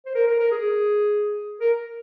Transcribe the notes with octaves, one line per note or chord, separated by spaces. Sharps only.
C5
A#4
A#4
A#4
G#4
A#4